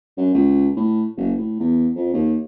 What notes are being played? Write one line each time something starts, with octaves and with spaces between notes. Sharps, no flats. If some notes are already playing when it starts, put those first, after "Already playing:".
F#2
C#2
A2
F#1
A2
E2
F2
D#2